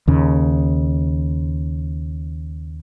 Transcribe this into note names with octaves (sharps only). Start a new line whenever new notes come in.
D#2 C#3